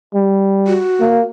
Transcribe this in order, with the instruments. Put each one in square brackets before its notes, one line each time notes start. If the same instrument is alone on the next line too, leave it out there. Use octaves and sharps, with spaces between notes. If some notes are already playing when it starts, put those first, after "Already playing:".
[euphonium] G3
[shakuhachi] F#4
[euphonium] A#3